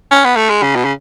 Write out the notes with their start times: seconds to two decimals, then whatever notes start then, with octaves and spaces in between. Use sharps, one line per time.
0.11 C#4
0.25 B3
0.37 A3
0.50 G#3
0.62 C#3
0.76 B2
0.85 C#3